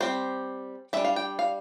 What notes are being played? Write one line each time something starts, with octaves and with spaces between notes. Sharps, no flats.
G3 C4 C5
G3 D4 E5
F5
G5
F5